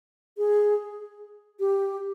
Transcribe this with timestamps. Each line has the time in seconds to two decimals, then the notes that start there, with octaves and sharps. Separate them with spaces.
0.38 G#4
1.60 G4